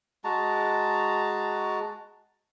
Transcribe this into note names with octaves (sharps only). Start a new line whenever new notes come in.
G#3 F#4 A5 A#5